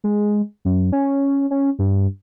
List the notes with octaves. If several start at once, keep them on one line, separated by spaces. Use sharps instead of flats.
G#3
F#2
C#4
C#4
G2